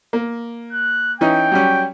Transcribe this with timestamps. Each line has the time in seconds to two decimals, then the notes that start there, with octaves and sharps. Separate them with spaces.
0.13 A#3
0.73 F#6
1.21 E3 C#4 D#4 G5
1.52 F#3 G3 C#4